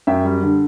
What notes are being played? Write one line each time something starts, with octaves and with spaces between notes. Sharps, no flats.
F#2 E5 G5
G3
D3